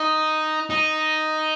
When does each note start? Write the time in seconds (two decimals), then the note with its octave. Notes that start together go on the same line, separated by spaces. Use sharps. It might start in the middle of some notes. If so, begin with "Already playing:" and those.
Already playing: D#4
0.70 D#4